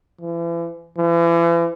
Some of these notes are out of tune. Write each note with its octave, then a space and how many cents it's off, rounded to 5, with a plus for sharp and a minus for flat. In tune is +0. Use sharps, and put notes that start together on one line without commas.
E3 +40
E3 +40